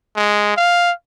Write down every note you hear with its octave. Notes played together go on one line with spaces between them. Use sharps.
G#3
F5